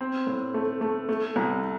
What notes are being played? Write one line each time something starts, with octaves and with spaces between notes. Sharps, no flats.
C4
A2
A3
A3
A3
C2